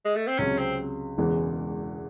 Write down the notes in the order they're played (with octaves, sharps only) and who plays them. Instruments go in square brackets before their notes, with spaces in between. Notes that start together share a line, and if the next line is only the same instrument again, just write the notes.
[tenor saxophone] G#3
A3
C4
[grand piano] C#2 C3 F#3 [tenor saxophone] C#4
[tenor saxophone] C4
[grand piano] E1 E2 C#3 E3 G#3